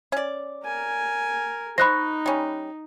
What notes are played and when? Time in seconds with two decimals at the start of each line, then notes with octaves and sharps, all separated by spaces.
0.12 C#4 D5
0.65 A#4 G#5
1.78 D#4 C5 D#5 B5 C#6 F#6 A#6
2.26 G3 C#4